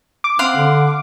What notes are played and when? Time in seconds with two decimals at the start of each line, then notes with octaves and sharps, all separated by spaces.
0.24 D6
0.39 C4 F5 F#5 C6
0.56 D3